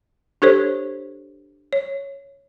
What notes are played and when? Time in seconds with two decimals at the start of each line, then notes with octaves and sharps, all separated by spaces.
0.42 D4 G4 A4 C5 C#5
1.73 C#5